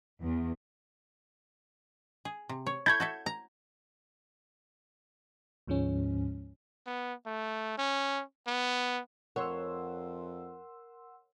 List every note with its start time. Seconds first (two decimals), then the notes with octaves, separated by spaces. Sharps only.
0.21 E2
2.25 G#4
2.49 C3
2.67 C#5
2.86 E4 A4 C#5 G6 G#6
3.00 F#4 A4 E5
3.26 A#5
5.67 D2 G#2 F3 G#3 C#4
6.87 B3
7.26 A3
7.78 C#4
8.47 B3
9.36 F2 A#4 C#5 F#5 C6 E6